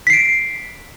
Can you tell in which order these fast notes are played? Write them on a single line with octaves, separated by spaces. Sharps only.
B6 C7 D7